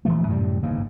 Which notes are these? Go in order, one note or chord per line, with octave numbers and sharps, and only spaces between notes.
D#1 E3 F3 A3
F#2 A2 C3 G3
G1 D#2 G#2 C#3